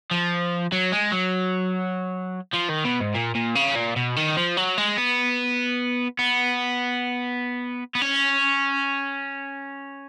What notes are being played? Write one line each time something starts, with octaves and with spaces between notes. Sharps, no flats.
F3
F#3
G#3
F#3
F3
D#3
B2
G#2
A#2
A#2
C#3
A#2
B2
D#3
F3
F#3
G#3
B3
B3
B3
C#4